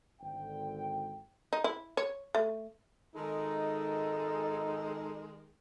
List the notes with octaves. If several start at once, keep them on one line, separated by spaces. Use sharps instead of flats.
G#1 D3 G5
D#4
E4
C#5
A3
G#1 D#3 G#3 D#4 A4